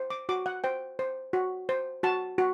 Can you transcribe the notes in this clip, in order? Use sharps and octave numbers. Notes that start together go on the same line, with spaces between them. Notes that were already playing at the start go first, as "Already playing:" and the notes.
Already playing: C5
D6
F#4 D6
F#5
C5 G5
C5
F#4
C5
F#4 A5
F#4